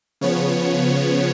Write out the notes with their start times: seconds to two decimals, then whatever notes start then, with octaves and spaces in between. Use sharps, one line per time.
0.21 C#3 F3 B3 C#5